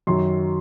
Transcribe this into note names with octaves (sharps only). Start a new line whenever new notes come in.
F#2 D#3 F#3 C6